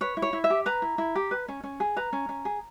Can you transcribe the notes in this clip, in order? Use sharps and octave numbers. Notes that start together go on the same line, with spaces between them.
B4 C#5
E4
C#5
E4
E5
G4
B4 A#5
E4
E4
G4
B4
C#4
C#4
G#4
B4 A#5
C#4
C#4
G#4